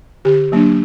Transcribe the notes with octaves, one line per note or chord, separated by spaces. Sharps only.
D3 G4
F#3 A#3 D4